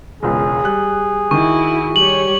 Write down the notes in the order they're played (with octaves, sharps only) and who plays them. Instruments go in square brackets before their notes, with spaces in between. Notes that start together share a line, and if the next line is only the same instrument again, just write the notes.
[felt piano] E1 C#2 [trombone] G#4
[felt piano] G3 F#6
[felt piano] D#3 [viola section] E4 F#4 [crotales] C#6
[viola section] G3 G4 C#5 [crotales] F#7